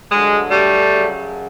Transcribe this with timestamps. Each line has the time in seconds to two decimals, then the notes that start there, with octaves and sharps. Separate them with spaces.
0.12 G2 D3 F#3 G#3
0.51 G3 A3
0.90 F#2 C#3 F#3